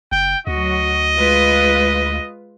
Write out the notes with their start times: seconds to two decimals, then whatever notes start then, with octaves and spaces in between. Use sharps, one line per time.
0.12 F#1 G5
0.47 D2 F#3 F#4 D#5
1.17 G#3 F4 B4